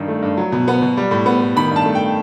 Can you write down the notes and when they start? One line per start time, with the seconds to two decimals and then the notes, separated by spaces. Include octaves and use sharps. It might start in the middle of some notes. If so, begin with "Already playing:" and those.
Already playing: G2 D#3
0.08 A3
0.22 G2
0.37 F#3
0.52 B2
0.68 B3
0.82 B2
0.97 G3
1.11 A2
1.26 B3
1.41 A2
1.56 D#3 B5
1.71 G2 A5
1.86 A3
1.95 G5